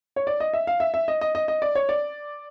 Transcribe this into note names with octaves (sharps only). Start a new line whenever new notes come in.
C#5
D5
D#5
E5
F5
E5
E5
D#5
D#5
D#5
D#5
D5
C#5
D5